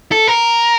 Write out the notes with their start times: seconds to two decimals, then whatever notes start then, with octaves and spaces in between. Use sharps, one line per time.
0.12 A4
0.28 A#4